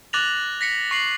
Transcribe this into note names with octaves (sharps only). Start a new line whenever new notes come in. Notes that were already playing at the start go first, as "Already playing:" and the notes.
D6 F#6 A6 A#6 F7 F#7
A#6 B6 C#7
C#6 C7 F#7